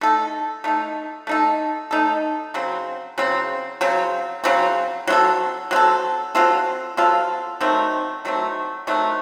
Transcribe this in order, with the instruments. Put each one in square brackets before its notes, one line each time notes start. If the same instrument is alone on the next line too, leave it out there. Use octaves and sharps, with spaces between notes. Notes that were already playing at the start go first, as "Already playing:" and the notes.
[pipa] A3 D#4 A4
A3 D#4 A4
A3 D#4 A4
A3 D#4 A4
C#3 F#3 C4
C#3 F#3 C4
C#3 F#3 C4
C#3 F#3 C4
F#3 C4 F4 A4
F#3 C4 F4
A4
F#3 C4 F4 A4
F#3 C4 F4 A4
D#3 F#3 A3 C4
D#3 F#3 A3 C4
D#3 F#3 A3 C4